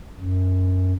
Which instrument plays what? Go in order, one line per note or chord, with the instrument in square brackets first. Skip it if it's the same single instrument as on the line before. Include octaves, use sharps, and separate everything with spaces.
[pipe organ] F#2